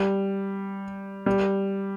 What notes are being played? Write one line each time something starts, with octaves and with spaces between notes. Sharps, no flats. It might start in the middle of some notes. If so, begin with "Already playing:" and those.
Already playing: G3
G3